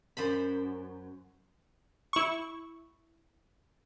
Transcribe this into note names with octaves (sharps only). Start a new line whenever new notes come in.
F#2 C5 B5
E4 C#6